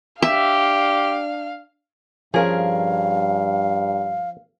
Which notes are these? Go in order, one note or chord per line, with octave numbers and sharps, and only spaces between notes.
D4 G4 E5 F5
G2 F3 C#4 F4 G#4 A#4 F5